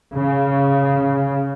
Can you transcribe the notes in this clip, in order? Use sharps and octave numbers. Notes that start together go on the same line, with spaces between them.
C#3